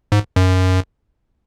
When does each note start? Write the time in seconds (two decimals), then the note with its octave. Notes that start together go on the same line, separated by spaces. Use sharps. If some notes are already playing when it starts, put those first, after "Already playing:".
0.12 G#2
0.36 F#2